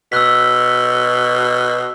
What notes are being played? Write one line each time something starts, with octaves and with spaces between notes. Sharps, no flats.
B2 E6 F#6 B6